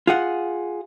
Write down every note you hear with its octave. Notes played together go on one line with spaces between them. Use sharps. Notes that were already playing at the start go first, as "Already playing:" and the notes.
F4 G#4 F#5